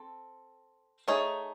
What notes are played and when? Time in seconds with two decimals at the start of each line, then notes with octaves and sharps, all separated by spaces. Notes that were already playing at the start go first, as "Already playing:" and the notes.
Already playing: C4 A4
1.08 A3 D#4 G#4 C#5